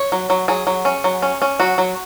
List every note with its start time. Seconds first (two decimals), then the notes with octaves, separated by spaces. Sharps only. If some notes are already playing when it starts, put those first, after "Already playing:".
Already playing: C#5
0.12 F#3
0.30 F#3
0.48 F#3 G#4
0.67 F#3
0.85 C#4
1.04 F#3
1.22 C#4
1.42 C#4
1.60 F#3 F#4
1.78 F#3